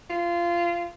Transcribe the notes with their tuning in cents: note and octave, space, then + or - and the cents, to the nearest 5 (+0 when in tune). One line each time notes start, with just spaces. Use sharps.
F4 -20